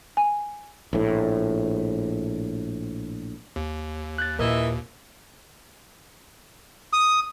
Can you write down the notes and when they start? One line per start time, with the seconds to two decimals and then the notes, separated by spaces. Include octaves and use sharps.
0.17 G#5
0.93 A#1 A2
3.56 D#2
4.18 F#6 G6 A6
4.39 A#2 E3 A#4 D#5 E5
6.93 D#6